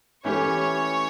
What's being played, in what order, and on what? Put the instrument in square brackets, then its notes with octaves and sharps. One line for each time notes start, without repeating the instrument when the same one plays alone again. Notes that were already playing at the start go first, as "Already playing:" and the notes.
[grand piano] E3 A3 C#4 G4 [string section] C#5